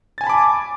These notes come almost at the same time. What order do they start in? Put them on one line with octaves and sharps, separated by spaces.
A6 G#5 A5 B5 D6